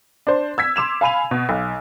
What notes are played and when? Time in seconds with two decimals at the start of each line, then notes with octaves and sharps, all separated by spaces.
0.27 D4 C5
0.58 E6 G#6 B6
0.76 C6 D6 E7 F7
1.01 F5 G#5 B5 D#7 F7
1.31 B2
1.49 B1